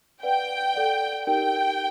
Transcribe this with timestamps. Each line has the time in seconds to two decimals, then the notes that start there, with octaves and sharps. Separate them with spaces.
0.22 B4 D5 F#5 G5
0.74 A4 D5 F#5
1.27 D#4 G4 A#4 G5